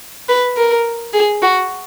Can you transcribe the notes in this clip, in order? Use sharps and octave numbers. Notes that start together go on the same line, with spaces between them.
B4
A#4
G#4
F#4